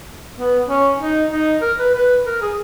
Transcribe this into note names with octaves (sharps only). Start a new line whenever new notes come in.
B3
C#4
D#4
D#4
A#4
B4
B4
A#4
G#4